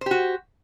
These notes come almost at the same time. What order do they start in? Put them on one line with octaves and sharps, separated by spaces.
C5 G4 F#4